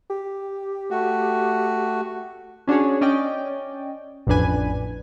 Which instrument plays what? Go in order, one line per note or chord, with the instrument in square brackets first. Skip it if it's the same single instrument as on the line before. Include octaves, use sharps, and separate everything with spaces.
[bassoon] G4
[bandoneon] A3 F#4
[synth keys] C#4 D4 F#4 G#4 C#5
C#4 D5 D#5 G5
A1 F2 A2 D4 B4 G#5